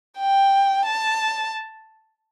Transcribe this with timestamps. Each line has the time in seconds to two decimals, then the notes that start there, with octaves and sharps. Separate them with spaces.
0.18 G5
0.85 A5